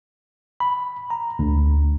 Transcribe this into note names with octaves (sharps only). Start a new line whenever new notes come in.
B5
A#5
D2